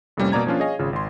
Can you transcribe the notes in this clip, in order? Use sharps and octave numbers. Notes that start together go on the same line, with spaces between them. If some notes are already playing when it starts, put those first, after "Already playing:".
F2 A2 C3 G3 A#3 C#4
B2 A#3 D5 A#5 G#6
F3 A#3 C#4 D4 F4
G#4 C#5 D#5 F5 G#5
G#1 C#3 F4
G#1 C6